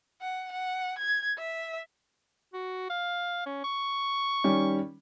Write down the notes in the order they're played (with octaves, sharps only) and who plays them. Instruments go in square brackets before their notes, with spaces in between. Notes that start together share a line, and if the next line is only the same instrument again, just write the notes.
[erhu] F#5
F#5
G#6
E5
[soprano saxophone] F#4
F5
C#4
C#6
[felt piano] D#3 G3 C#4